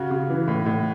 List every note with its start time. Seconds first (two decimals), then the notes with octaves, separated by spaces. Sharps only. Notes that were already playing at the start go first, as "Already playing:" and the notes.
Already playing: C#3 F#4
0.11 C#3
0.30 E3
0.48 A2
0.66 A2